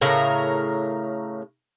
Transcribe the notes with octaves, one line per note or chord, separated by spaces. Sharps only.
A2 C#3 A#4